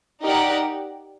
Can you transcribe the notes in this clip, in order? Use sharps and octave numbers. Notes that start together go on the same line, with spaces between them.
D#4 G4 A#4 D5 F#5